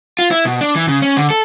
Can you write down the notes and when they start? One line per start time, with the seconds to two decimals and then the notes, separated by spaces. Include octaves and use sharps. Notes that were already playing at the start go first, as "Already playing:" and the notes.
0.19 F4
0.31 E4
0.45 B2
0.61 D4
0.75 E3
0.88 C#3
1.02 C#4
1.17 D3
1.31 A4